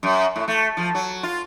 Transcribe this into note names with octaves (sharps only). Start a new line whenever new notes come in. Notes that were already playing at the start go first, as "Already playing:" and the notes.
F#2
A2
A3
F3
F#3
F4